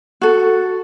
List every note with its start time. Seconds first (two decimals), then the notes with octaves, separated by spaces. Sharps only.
0.21 F#4 A4